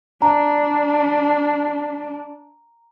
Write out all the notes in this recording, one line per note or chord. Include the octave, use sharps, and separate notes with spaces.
D4 A#5